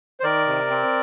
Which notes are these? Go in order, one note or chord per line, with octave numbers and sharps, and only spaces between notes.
C5
D#3 A#4 D5
C3
C4